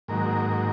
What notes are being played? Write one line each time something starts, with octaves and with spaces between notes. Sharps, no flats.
G#2 D#3 F#3 A#3 A#4
A#3 A#4